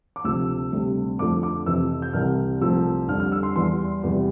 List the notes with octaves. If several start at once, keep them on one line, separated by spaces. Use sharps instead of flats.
D6
D2 C3 F3 A3 E6
D2 C3 G3
F2 D3 F3 A3 D6
D6
F2 C3 E3 E6
G6
C2 C3 E3 F6
C2 C3 F3 A3 E6
F2 D3 G3 F6
F6
E6
C6
E2 E3 G3 C6
E2 C3 E3 G3